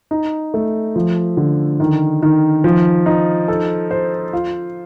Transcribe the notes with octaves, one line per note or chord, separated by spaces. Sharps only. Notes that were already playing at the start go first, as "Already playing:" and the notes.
D#4
A3
F3
D3
D#3
D#3
F3
D#4
A4
C5
F4